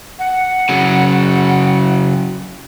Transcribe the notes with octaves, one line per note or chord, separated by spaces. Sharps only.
F#5
C#3 F#3